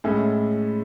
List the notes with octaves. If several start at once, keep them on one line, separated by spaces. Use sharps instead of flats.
A2 G#3 C#4 E4 A4